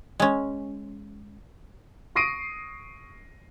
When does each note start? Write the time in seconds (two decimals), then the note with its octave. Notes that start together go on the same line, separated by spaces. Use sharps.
0.20 G#3 C#4
2.16 C#6 D#6 A#6 C7 D7 D#7